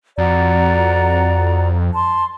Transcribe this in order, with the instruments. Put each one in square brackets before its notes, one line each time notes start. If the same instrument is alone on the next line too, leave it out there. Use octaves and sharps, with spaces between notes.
[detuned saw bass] F2 [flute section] F#4 D5 A#5
[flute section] A5 C6